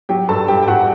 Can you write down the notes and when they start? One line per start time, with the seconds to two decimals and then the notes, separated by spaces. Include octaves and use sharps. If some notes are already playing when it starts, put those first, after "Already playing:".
0.09 F#3 G4 G5
0.29 G2 A4 A5
0.48 G2 G4 G5
0.62 G5
0.67 G2 F#4 F#5